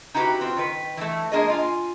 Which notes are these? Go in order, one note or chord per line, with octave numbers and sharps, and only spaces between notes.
D#4 E4 F#4 G4 B4
C4 F4
D#3 B4
E3 A3
G#3 A#3 D4 G#4 D#5
F4 G#5